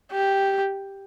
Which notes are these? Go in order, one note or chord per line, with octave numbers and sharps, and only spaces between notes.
G4